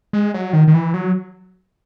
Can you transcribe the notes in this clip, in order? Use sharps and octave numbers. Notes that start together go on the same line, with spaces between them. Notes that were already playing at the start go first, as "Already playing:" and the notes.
G#3
F#3
D#3
D#3
E3
F#3